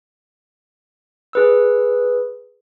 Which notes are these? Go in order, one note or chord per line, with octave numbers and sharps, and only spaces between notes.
G#4 B4 E6